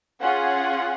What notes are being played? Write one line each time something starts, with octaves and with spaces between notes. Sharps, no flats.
C#4 F4 G#4 F#5